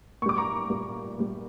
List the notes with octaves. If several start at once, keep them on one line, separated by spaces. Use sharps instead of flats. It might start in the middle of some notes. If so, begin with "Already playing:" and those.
A#2 G3 C#6 D6
A#5 C#6
A#2 G3
A#2 G3